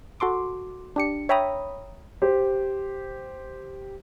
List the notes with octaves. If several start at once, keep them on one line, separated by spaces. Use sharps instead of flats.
F#4 A4 C6 D6
D4 G4 C#7
C#5 E5 G5 A#5 B5 D#6
G4 C5